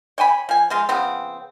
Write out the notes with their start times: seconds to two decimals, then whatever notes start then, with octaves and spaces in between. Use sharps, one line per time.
0.18 C#5 G5 G#5 B5
0.49 F3 G#5
0.70 F3 G#3 F4
0.89 C#3 F3 B3 C4